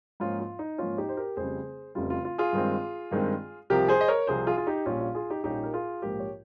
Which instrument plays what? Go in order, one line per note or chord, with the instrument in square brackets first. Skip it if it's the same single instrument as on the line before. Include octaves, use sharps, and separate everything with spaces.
[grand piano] G#2 F3 A#3 C#4 F4
F4
D#4
G#2 F3 A#3 C#4 F4
D#4 G4
C5
G4 A#4
F1 F2 C#3 G3 G#4 C5
F1 F2 C#3 G3 F4
F4
F4
F4 G#4
G2 D#3 G#3 C4
G2 D#3 G#3 C4
C2 C3 F3 G4 A#4
G#4 C5
D#5
A#4 C#5
C2 C3 F3 G#4 C5
F4 G#4
F4
D#4 G4
A#1 A#2 G3 C#4 F4
F4
F4 G#4
D#4 G4
A#1 A#2 G3 C#4 D#4 G4
A#4
F4 G#4
A#1 G#2 F3 G4 A#4
C#5